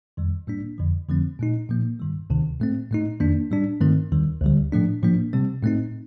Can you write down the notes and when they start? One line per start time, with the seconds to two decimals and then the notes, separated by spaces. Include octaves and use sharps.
0.17 F2 D#3 G3
0.47 A2 G3 A#3 D4
0.78 F2 D3 F3
1.08 F2 D3 F3 A3 C4
1.39 A#2 A3 D#4
1.69 A#2 F3 A#3
1.99 G2 D#3 G3
2.30 D2 C3 D#3
2.60 A2 A3 C4
2.91 A2 A3 D#4
3.20 F2 D#3 A#3 D4
3.51 A2 G3 D4
3.81 G2 D#3 A3 C4
4.12 D#2 D#3 G3
4.41 D2 D3 G3
4.72 A2 F3 A3 D4
5.02 A2 F3 A#3 D4
5.33 C3 G3 C4
5.63 A2 A3 C4 D#4